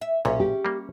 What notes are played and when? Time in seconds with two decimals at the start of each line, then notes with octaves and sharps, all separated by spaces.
0.01 E5
0.25 B1 A#2 C#4 G#4
0.40 G4
0.65 G3 A#3